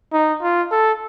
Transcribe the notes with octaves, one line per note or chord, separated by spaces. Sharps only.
D#4
F4
A4